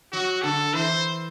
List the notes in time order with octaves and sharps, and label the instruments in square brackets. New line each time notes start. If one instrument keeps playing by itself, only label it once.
[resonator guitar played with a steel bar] F#3 [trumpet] F#4
[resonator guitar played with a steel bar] D3 [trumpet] A4
[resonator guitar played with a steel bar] E3 [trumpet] C5